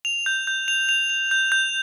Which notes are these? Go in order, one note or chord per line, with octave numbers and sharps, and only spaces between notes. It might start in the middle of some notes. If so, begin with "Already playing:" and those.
F7
G6
G6
F7
F7
F7
G6
G6